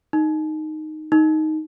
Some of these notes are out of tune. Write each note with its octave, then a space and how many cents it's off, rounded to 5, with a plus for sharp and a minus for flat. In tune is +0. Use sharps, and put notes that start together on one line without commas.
D#4 -5
D#4 +5